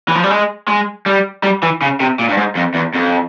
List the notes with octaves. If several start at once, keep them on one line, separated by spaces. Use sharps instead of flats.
E3
F3
G3
G#3
G#3
G3
G3
E3
C#3
C3
A#2
G2
G#2
F2
E2
F2